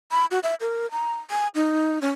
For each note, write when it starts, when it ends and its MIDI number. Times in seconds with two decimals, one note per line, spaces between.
0.11 0.26 83
0.31 0.39 66
0.43 0.55 76
0.61 0.90 70
0.91 1.15 82
1.31 1.48 80
1.55 1.99 63
2.02 2.09 61